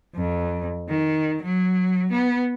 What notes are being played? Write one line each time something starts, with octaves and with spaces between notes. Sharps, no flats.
F2
D#3
F#3
B3